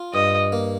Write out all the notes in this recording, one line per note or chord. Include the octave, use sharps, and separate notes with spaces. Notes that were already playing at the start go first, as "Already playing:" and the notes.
Already playing: F4
G2 D#5
A#3